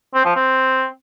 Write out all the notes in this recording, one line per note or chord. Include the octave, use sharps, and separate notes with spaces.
C4
F3
C4